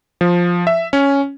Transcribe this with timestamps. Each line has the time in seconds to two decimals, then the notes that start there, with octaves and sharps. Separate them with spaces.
0.21 F3
0.67 E5
0.93 C#4